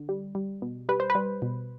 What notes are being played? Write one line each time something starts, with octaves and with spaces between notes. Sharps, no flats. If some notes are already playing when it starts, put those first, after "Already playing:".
Already playing: D3
G3
G3
B2
G3 B4
C5
B4
G3
B2